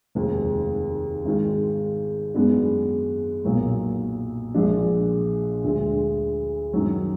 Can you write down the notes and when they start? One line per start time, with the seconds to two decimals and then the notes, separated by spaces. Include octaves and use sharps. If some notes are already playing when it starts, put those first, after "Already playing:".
0.15 F1 D#2 D#3 G#3
1.25 G#1 G#2 D#3 G#3
2.34 F#2 D#3 G#3 B3 D4
3.44 B1 A#2 F#3 A#3
4.54 A#1 A#2 F3 G#3 D4
5.64 D2 D3 G#3
6.73 F#2 D#3 F#3